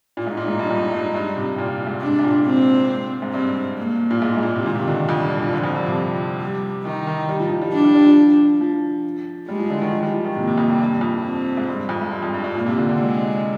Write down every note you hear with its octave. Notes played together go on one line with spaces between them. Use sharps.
A#2
G#2 D#4
A#2
G#2
G2
F2
G2
G2
C3
A#2
G#2
C3 D4
G#2
A#2
C4
G#2
G2 C4
A#3
A#2
G#2 G#3
G#2
A#2
C3
A#2 D#3
C3
D3
F2
G2
A#2
A#2
D3 F3
F2
G2
C3
G3
D#3 D#4
D#3
G3
F3
F3
G3
F3 D4
G3
G3
F3
F3
G3 G#3
F3
D3
D#3
F3
G3
F3
D#3
C3 A#3
C3
F2
G2
G2
F2
C4
G#2
G2
F2
G#2
G2
F2
G2
G2
A#2 A#3
C3
D3
D3
G#3